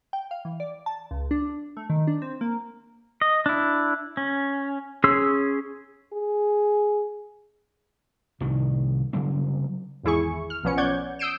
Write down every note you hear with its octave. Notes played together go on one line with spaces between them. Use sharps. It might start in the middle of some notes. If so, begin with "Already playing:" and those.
G5
F5
E3
D5
A5
C#2
D4
A3
D#3
D4
C4
A#3
D#5
D4 E4
C#4
C#4 G#4 C#5 C6 E6
G#4
C2 A2 D#3
C#3 F#3 G3 C4
G#1 E2 E4 G#4 C#6
F6
B1 F3 B3 C#4 C#7
C#5 D5 F#5 G6 G#6
D#6 E6 G6 C7 D7 E7